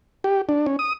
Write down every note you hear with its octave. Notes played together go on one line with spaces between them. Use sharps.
G4
D4
C#4
D#6